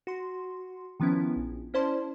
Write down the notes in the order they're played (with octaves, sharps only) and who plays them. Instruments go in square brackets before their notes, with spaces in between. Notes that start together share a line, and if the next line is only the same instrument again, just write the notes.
[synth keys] F#4 C6
D#3 F3 B3 C#4 E4
A#1
C#4 E4 C5 D5 A5 C6